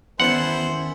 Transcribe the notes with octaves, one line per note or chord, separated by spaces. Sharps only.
E2 D#3 C#4 E4 C5 F#5 A5